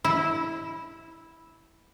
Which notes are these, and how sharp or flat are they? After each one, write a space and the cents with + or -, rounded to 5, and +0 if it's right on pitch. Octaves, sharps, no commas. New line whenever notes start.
E4 -10